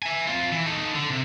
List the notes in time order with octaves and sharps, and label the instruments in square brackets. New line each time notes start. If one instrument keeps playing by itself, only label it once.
[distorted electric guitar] E5 G#5
C4 F4
E3
D#4 A4
D3
C3